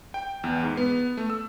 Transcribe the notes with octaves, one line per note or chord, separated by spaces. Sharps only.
G5
E2
G#2
B3
A3
E6